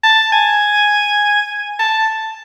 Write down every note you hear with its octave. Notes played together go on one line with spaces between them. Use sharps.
A5
G#5
A5